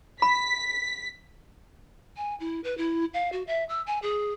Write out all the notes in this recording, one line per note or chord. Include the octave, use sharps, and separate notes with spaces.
B5 B6
G#5
E4
B4
E4
F5
F#4
E5
E6
G#5
G#4